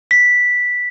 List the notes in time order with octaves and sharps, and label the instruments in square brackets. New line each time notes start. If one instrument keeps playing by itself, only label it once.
[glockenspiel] B6